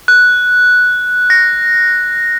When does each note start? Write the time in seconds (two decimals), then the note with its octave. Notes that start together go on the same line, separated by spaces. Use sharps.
0.08 F#6
1.30 A#6